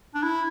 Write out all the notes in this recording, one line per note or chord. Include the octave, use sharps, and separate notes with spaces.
D4
E4